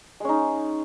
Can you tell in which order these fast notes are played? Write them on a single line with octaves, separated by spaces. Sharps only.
G#3 C#4 D#4